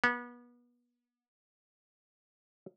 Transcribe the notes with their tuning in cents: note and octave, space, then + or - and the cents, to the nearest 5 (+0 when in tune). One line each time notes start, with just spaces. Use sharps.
B3 -30